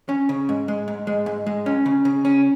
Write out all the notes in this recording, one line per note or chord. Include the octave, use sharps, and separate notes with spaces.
C#4
C#3
G#2
G#3
G#2
G#3
G#2
G#3
C#4
C#3
C#3
C#4